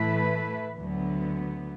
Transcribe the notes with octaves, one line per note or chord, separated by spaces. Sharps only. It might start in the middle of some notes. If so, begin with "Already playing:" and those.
Already playing: A2 E3 A3 E4 B4
D2 D3 F#3 B3